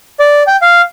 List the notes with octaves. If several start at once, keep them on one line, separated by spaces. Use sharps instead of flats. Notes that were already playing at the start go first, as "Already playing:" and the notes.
D5
G5
F5